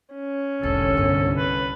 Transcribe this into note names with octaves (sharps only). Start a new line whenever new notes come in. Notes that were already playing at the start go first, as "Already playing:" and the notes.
C#4
F1 C2 A2 D3 A4
G2 B3
B4